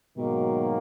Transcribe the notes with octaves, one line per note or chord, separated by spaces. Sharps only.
G#2 B2 D#3 F#3 A#3